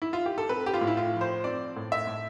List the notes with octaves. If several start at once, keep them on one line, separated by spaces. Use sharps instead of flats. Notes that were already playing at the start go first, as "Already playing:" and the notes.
E4
F4
G4
A4
C4 B4
G4
F4
A2
E4
F4
F3
C5
C4 D5
A2
E5
A2